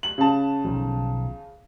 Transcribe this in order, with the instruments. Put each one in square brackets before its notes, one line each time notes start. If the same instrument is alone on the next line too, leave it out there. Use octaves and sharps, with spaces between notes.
[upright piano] F#7
C#3 A5
[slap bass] B1 D#3 F3